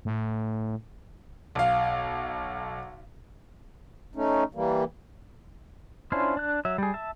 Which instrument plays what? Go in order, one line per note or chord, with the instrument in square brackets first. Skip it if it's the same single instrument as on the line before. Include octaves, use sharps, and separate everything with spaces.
[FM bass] A2
[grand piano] B1 F5
[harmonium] A3 C#4 D#4
E3 G3 A#3
[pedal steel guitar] C#4 D4 E4 F4 C5
D4 F#6
F#3 E5
G3 G#4
E5 A5